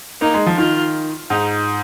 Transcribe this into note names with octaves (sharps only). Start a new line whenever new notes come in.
A#3 D#4
G#3
F3
D#3 F4
G#2 D#4